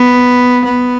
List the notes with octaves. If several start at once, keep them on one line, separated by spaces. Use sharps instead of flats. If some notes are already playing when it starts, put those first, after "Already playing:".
Already playing: B3
B3